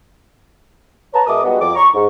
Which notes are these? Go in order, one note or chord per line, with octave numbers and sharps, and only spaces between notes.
B4 C#5 A5 A#5
B2 G#3 A#4 E5 D6 D#6
G3 G#3 B3 D#4 F#4
F2 D6
A#5 C#6
G#2